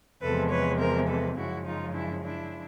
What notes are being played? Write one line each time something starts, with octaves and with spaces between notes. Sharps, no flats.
E2 C3 F3 G#3 A4 B4
B4 C#5
A#4 C5
A4 B4
F#2 C#3 F3 G#3 E4 F#4
D#4 F4
D4 E4
D4 E4